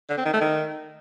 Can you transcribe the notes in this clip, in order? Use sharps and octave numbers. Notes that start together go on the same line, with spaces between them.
D3
C4
D#3
A3
D#3